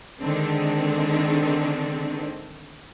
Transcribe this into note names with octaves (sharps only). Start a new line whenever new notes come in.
D3 D#3 G#3 C4 D4